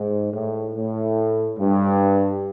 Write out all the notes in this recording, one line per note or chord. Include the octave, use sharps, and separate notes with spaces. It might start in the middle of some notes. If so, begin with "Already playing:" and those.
Already playing: G#2
A2
A2
G2